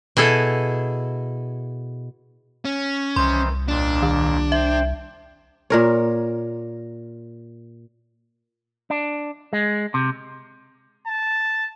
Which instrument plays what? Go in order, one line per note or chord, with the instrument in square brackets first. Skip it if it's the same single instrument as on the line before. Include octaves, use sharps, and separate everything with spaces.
[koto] B2 E4 G#4 A4
[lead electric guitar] C#4
[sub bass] C2 [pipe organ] D#3 E3 C5 [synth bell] C6
[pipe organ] D#2 A#2 [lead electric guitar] D4
[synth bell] D#3
[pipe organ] C5 G5 [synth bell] E5
[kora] A#2 A#4 C#5
[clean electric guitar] D4
G#3
C3
[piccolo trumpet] A5